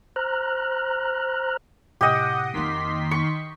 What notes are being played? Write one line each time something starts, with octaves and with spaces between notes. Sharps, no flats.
C5 A#5 F6 F#6
A2 C3 G4 D#5 F#5 D#6
F2 D#3 A#3 C6 B6
C#6